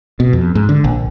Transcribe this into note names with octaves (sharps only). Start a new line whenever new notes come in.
B2
F2
G#2
D3
A#1